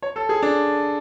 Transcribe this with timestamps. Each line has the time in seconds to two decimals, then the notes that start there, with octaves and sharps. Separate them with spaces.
0.02 C#5
0.16 A4
0.29 G#4
0.42 D4